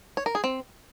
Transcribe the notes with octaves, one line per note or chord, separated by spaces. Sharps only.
C#5
A#4
G#4
C4